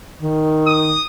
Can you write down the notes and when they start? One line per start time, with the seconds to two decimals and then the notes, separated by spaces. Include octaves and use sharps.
0.21 D#3
0.67 D#6